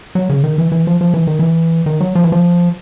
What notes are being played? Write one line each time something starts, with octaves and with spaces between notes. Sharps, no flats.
F#3
C#3
D#3
E3
E3
F3
F3
E3
D#3
E3
D#3
F#3
F3
E3
F3